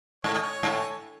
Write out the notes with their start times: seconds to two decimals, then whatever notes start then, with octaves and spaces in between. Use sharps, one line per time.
0.24 G#2 C#5
0.34 D#5
0.42 C#5
0.63 G#2
0.67 A2